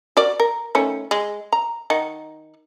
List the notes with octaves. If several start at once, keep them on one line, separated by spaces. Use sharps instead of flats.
F#4 A#4 D5
A#4
D#3 A3 C#4
G#3
A#5
D#3 D#4 F#5